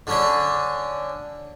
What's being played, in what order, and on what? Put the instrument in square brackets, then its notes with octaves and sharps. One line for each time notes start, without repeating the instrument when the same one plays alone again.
[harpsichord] D3 C#4 D4